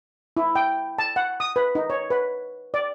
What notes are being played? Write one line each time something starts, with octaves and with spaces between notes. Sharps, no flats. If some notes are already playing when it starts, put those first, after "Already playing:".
E4
G5
A5
F#5
D#6
B4
D#4
C#5
B4
D5